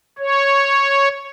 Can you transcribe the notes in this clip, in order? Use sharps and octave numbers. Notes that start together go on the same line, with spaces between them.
C#5